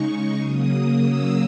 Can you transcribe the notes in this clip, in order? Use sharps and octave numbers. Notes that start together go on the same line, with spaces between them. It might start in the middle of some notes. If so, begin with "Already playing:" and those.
Already playing: C#3 G#3 D#4 C#6
C#3 F#3 A#3 D#6
E6